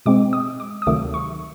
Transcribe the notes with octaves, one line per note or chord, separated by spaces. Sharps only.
B2 G#3 C4 D6
D#6
D6
D#6
D2 C3 D#3 F#3 A3 D6
C#6